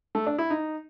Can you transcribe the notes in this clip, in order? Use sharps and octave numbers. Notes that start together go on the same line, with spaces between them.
A3
D4
E4
D#4